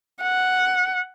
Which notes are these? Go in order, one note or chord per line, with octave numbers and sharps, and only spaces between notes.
F#5